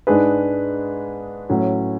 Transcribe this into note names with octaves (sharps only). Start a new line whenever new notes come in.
G#2 G#3 D4 G#4 B4
A2 F#3 C#4